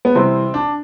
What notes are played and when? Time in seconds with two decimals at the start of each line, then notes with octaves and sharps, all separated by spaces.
0.05 B3
0.15 C3 E3 G3 C4
0.54 D4